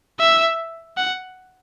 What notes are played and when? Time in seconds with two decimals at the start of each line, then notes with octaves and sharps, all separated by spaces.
0.19 E5
0.97 F#5